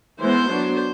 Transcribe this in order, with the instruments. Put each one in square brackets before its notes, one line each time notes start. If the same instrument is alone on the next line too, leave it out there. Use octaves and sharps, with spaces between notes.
[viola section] E3 G#3 B3 C5
F#3 B3 D4